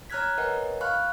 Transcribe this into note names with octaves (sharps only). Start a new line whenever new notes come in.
C#5 A#5 F6 F#6 G#6 B6
A#4 B4 C#5 D#5 F#5 G#5
F5 B5 C#6 F6 F#6